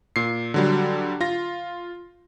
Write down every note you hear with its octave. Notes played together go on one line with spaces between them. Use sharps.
A#2 C7
D3 F#3 G3
F4 A#6